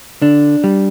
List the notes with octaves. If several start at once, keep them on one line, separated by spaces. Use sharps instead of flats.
D3 D4
G3